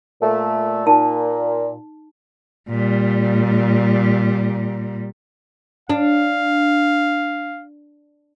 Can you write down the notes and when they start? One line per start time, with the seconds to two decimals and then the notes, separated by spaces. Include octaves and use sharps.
0.21 A#2 A3
0.87 A#2 D#4 A5
2.69 A#2 G3
5.90 D4 F5